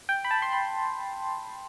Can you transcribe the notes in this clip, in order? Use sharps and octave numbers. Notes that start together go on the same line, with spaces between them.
G5
B5
A5
C6
B5